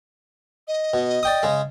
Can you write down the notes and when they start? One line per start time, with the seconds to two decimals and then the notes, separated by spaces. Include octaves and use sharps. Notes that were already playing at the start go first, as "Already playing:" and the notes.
0.68 D#5
0.94 B2
1.23 D5 G5 D#6
1.43 C#3 G#3